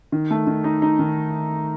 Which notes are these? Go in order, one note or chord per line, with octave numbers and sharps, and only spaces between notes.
D#3
A3
D#3
D#4
D#4
D#3